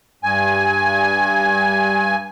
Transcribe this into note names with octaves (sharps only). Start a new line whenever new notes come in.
G2 G#5